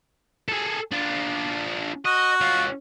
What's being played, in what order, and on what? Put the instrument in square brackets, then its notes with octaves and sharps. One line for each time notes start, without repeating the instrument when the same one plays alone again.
[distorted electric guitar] G#4 A4
D4 F4
[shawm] F#4 [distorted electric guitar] D#5
[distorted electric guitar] C#4 F4